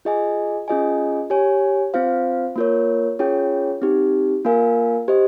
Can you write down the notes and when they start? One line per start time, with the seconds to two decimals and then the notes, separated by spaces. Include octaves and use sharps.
0.05 F4 G#4 D#5 G#5
0.68 C#4 F4 G#4 D#5 G#5
1.30 G4 C#5 G#5
1.94 C4 F4 C5 F5
2.56 A#3 F4 A#4 C#5
3.19 C#4 F4 G#4 C#5 G5
3.82 C4 D#4 G4
4.45 A#3 F4 A#4 F5 G#5
5.08 G4 C5 D#5